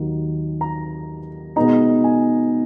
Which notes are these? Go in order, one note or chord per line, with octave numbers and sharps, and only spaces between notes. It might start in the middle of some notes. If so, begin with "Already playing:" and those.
Already playing: D#2 D#3 F#3
A#5
B2 G#3 B3 D#4 A#5
G#5